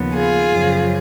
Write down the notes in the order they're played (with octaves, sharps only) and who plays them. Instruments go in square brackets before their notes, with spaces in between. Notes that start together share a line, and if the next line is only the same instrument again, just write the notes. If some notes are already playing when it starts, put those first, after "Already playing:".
Already playing: [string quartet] D#2 C#3 F3 B3
F4 G#4
F#2 C#3 F3